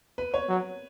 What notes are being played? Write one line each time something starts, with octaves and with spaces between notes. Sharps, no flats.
B4
C#5
F#3